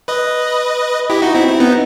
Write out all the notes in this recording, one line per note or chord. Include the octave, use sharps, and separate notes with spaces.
B4 D#5
E4 G4
D#4 F#4
C4 E4
C4
B3 D#4